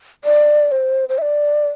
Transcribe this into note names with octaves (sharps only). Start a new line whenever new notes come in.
D5
C5
C5
E5
D5